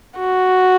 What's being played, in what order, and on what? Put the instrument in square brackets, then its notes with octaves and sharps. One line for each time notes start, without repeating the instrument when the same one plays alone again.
[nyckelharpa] F#4